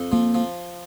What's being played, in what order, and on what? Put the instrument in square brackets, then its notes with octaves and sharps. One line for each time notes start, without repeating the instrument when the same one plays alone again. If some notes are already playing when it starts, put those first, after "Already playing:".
Already playing: [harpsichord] F2
[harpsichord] F3 [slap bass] A#3
[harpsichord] F3